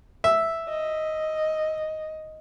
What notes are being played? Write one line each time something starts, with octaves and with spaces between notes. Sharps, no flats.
E5
D#5